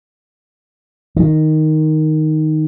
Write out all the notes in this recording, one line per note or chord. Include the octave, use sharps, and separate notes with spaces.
D#3